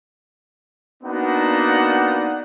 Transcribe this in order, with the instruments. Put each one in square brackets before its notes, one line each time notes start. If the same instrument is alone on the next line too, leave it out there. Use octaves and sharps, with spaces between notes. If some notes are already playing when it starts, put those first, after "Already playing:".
[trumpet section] A#3 B3 D4 D#4 F#4 F#5